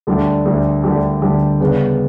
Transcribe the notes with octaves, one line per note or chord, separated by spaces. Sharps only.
D2 D3 G3 D4 G4
D2 D3 G3 D4 G4
D2 D3 G3 D4 G4
D2 D3 G3 D4 G4
C#3 G3 B3